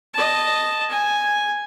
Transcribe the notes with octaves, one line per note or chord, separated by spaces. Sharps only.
D#5 A5
G#5